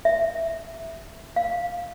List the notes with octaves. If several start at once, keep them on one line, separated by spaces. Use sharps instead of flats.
E5
F5